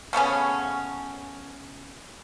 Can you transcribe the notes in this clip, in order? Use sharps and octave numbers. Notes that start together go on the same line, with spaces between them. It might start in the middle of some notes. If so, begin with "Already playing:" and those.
C#3 A3 B3 C#4